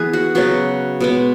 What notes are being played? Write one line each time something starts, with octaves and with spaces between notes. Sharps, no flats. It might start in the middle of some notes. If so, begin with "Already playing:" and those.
Already playing: E3 B3 G#4 B4
F#4
C#3 F#3 B3 F#4
B2 G#3 B3